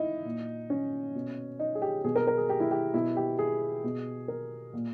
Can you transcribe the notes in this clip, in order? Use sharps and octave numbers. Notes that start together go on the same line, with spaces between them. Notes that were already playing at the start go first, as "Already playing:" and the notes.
Already playing: D#4 E4
A#2
C#4
B2
D#4
G#4
G4
B2 G#4
A#4
A#4
G#4
G4
E4
G4
B2 E4
G4
G#4
B2
A#4
A#2